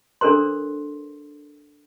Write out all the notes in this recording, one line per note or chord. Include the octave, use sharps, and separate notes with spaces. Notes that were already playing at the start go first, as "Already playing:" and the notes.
D4 A4 A#4 C5 C6